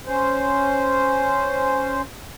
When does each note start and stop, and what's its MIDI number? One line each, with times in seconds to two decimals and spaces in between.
0.06 2.01 61
0.06 2.01 72